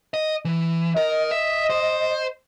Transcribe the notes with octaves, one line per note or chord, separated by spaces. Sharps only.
D#5
E3
A#4 D#5
E5
C5